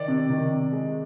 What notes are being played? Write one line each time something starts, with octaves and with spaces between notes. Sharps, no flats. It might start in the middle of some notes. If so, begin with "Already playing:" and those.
Already playing: D#3 D5
C3
D#3
C3
G#3